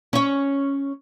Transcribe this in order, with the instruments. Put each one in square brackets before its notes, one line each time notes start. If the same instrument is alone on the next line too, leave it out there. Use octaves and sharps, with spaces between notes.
[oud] C#4 C#5